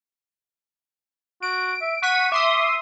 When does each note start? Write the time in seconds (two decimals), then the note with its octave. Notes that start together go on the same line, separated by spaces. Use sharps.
1.42 F#4 D7
1.81 E5
2.02 F#5 C#6 B6 D#7
2.32 E5 C6 D6 D#6